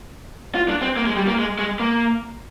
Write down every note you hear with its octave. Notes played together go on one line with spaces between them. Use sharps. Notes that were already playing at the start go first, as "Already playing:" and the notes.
F4
D4
C4
A#3
G#3
G3
A#3
G#3
G#3
A#3